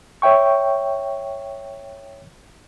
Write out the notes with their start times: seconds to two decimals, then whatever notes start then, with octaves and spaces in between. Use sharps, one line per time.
0.22 C#5 E5 G5 C#6